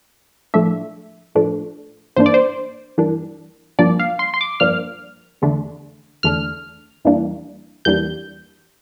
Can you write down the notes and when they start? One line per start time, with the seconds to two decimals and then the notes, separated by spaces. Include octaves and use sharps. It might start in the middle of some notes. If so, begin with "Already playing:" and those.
0.54 A2 F3 A3 D4 E5
1.35 A2 F3 A3 D4
2.16 G2 E3 A#3 D4 C5
2.26 D5
2.34 C5
2.98 G2 E3 A#3 D4
3.79 G2 F3 A#3 D4 D5
3.99 F5
4.19 C6
4.34 C6
4.41 D6
4.60 G2 F3 A#3 D4 F6
5.42 E2 D3 A3 D4
6.23 E2 D3 A3 D4 F6
7.05 E2 E3 G3 A#3 D4
7.85 E2 E3 G3 A#3 D4 G6